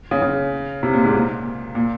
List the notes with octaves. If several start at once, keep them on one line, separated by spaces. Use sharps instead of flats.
C#3
C#3
C3
A#2
G#2
A#2
A#2